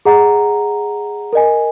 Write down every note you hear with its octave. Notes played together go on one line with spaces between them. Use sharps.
G#4 D#5 F#5 A#5
A#4 D#5 G#5